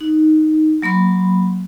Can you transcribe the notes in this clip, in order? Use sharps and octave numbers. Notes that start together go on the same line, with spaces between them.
D#4
F#3 A#3 B5 C6